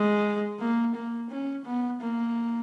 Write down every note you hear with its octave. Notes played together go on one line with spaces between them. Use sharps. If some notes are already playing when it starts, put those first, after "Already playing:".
Already playing: G#3
A#3
A#3
C#4
B3
A#3